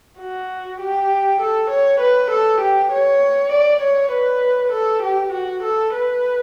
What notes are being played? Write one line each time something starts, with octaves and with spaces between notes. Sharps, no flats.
F#4
G4
A4
C#5
B4
A4
G4
C#5
D5
C#5
B4
A4
G4
F#4
A4
B4